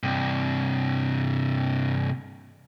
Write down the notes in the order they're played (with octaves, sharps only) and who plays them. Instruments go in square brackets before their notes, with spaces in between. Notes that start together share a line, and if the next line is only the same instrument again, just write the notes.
[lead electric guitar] G2 C3